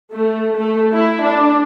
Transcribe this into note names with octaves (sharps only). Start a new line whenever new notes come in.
A3
A3
E4
D4